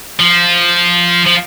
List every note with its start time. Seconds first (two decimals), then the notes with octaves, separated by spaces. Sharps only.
0.19 F3
1.26 F3